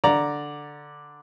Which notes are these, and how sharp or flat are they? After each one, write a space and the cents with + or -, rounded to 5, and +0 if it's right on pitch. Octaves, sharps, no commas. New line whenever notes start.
D3 +0 D5 +0 A#5 +0